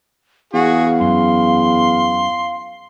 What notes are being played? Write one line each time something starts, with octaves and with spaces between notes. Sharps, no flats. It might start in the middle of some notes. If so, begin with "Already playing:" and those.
E2 F#4 G#4 F5
F#2 C6